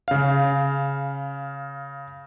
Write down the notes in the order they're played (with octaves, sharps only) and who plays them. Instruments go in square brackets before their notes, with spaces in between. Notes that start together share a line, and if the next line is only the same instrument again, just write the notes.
[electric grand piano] C#3 F5